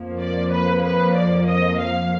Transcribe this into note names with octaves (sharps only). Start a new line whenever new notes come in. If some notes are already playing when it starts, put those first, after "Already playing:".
Already playing: F2 F3 A#3
D5
B4
B4
D5
D#5
F5